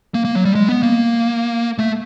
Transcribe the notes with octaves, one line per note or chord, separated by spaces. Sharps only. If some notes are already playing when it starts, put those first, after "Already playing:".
A#3
A#3
F#3
G3
G#3
B3
A#3
A3